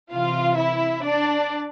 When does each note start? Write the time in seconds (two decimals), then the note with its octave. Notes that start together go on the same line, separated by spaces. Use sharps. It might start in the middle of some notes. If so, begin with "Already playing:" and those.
0.12 C3 E3 F4 F5
0.58 E4 E5
1.04 D4 D5